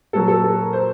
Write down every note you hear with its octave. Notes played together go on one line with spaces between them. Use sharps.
A#2 F#3 A4
A4
A4
A#4
C5